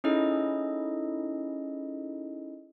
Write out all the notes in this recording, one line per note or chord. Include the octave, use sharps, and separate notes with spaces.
C#4 D#4 E4 G#4 A4 D#5